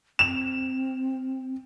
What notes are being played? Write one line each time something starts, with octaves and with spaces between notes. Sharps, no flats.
C4 E7 F7